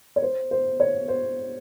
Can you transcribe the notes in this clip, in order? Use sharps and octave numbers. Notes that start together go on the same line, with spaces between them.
C#5
C5
C5
C#5
C5